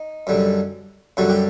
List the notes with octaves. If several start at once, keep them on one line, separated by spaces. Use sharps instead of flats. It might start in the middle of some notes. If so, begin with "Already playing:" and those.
Already playing: D#4
F#2 D3 G3
F#2 D3 G3 F#4
G4